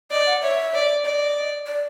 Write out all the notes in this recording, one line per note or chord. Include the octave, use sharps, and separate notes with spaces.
D5 D#5
F#5
C#5 E5
D5
D5 D#5
D5